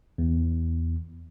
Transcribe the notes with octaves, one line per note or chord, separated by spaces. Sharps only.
E2